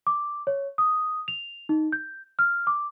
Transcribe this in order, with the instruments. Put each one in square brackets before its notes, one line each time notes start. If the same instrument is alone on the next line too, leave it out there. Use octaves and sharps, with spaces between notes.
[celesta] D6
C#5
D#6
F7
D#4
G6
F6
D6